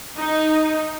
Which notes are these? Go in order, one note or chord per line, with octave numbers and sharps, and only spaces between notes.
D#4